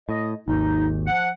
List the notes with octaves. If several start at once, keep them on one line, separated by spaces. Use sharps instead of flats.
A2 D#5
G#1 D#2 D#4
F3 F#5